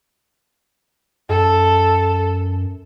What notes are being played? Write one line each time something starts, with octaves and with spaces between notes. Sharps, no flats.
F#2 A4